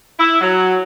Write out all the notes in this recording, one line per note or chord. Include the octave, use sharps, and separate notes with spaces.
E4
F#3